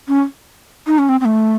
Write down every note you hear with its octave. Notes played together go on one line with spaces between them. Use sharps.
C#4
D#4
C#4
C4
C4
A3